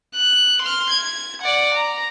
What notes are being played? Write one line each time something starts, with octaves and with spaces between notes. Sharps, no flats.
F#6
C6 F6
G#6
D5 F#5
A#5